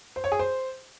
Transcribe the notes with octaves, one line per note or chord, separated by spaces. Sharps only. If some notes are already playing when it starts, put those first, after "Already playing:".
C5
C#5
G#4
C5